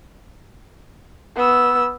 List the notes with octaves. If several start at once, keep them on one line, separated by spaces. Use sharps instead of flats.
B3 E6